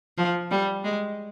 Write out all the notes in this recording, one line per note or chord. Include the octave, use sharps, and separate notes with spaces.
F3
G3
G#3